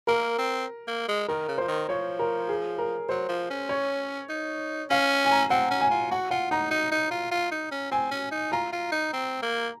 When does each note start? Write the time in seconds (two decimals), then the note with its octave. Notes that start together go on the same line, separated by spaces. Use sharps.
0.07 A#3 A#4
0.38 C4
0.88 A#3
1.08 G#3
1.28 D#3 A#4
1.48 C#3
1.58 F3 C5
1.68 D#3
1.89 F3 C#5
2.19 A#4
2.49 G#4
2.78 A#4
3.09 F#3 C5
3.29 F3
3.50 C#4
3.69 C#5
4.29 D#4
4.90 C#4 F5
5.25 G#5
5.31 A#5
5.50 C4 F#5
5.71 C#4
5.81 G#5
5.91 F4
6.11 F#4 F#5
6.31 F4 F#5
6.51 D#4 A#5
6.71 D#4
6.92 D#4
7.11 F4
7.32 F4
7.51 D#4
7.72 C#4
7.92 C4 G#5
8.11 C#4
8.32 D#4
8.52 F4 A#5
8.73 F4
8.92 D#4
9.13 C4
9.43 A#3